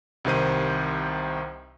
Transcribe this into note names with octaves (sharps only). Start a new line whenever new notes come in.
C2 C3 D#3 C5 D#7